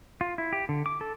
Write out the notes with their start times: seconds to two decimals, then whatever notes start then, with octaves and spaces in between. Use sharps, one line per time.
0.21 F4
0.38 E4
0.53 G4
0.69 D3
0.86 D6
1.01 A4